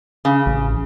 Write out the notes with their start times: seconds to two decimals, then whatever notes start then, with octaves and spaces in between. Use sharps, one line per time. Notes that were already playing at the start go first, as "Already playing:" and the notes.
0.25 C#3
0.46 A1